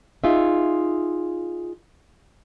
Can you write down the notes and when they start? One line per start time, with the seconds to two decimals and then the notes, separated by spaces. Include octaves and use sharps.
0.24 D#4 F4 G#4 E5